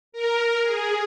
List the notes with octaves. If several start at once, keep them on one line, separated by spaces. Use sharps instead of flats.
A#4
G#4